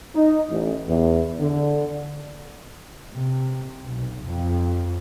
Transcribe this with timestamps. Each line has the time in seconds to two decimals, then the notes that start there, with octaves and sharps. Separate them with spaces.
0.15 D#4
0.51 A1
0.88 E2
1.40 D3
3.15 C3
3.85 B1
4.27 F2